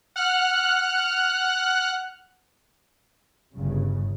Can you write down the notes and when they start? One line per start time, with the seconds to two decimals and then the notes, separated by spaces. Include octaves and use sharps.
0.16 F#5 F6 F#6
3.55 G1 G2 C#3